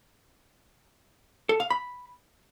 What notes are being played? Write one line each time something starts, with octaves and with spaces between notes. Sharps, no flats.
A4
F5
B5